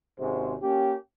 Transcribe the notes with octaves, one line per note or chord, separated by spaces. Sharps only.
G#1 G#2 C3 G#3 C#4 C5
A#3 C#4 G4